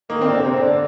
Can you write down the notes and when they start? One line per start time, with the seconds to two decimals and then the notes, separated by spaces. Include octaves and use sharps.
0.10 D#3 A#3
0.22 D3 C4
0.41 C3 C4
0.57 D3 D4